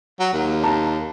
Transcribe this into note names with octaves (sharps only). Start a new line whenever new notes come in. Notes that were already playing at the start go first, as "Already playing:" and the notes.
F#3
D#2
A5 A#5